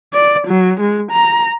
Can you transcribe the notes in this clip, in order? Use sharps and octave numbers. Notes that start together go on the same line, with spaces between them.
D5
F#3
G#3
A#5